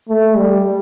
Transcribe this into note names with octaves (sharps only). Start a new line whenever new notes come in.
A3
G3